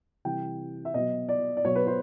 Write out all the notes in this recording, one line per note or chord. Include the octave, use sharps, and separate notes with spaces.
C3 E3 G3 G5
E5
B2 F#3 D#5
D5
D5
B2 F#3 C#5
B4
C5